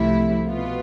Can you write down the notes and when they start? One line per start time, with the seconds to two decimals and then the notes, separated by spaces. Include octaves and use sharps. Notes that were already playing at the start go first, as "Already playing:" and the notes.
Already playing: C2 C3 F3 A3 E4
0.47 B2 B3 F4